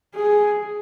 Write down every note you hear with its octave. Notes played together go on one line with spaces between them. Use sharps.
G#4